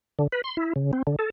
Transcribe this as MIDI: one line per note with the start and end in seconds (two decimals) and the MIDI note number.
0.19 0.27 50
0.32 0.42 71
0.44 0.57 84
0.57 0.73 64
0.76 0.91 49
0.93 1.03 60
1.07 1.16 50
1.19 1.30 69